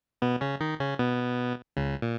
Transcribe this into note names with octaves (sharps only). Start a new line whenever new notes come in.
B2 B3
C#3 C#4
D#3 D#4
C#3 C#4
B2 B3
C#2 C#3
A#2